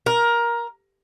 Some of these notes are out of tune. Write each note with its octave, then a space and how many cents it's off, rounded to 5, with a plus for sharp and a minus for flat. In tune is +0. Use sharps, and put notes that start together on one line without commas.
A#4 +15